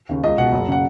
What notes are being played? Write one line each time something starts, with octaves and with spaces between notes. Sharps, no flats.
D#2 C#3
C#2 D#5
B2 F#5
F#1
C#3 F#5